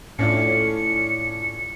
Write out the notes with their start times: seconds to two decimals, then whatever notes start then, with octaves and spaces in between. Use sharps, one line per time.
0.19 A2 C#4 D4 F4 C#7